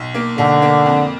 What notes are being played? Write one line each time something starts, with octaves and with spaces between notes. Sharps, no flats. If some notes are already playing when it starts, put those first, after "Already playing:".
Already playing: B1
A#3
B1 D3
A#3
F2